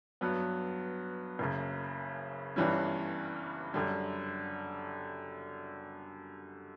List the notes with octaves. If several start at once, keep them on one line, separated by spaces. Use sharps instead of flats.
G2 F#3 B3
F#1 F#2 C#3
G1 G2 E3 G3 C#4
F#2 D3 G3